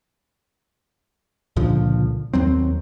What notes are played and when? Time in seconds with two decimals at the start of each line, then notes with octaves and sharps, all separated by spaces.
1.56 C#2 A#2 D3 F3
2.34 D#2 F#3 C4